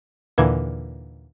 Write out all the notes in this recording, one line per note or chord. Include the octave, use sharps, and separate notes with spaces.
D#2 A#2 D3 E3 G#6